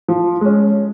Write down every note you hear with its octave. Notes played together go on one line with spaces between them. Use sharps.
F3
G#3 C#4